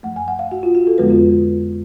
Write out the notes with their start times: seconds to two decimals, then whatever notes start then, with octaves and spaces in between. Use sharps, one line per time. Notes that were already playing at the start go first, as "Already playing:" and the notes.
0.03 F#2 F3 A3 F#5
0.16 G#5
0.28 F#5
0.39 F5
0.52 F#4
0.63 F4
0.75 F#4
0.87 A4
0.98 F2 D3 F3 G#3 B3 B4
1.10 F4